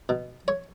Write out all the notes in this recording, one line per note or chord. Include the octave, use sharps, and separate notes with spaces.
B2
C#5